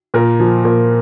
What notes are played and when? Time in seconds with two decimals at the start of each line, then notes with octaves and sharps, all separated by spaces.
0.14 A#2 A#4
0.40 F3
0.65 A#2